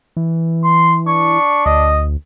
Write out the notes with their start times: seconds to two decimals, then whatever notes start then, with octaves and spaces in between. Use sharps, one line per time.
0.17 E3
0.64 C6
1.07 D4 C#6
1.66 D2 D#5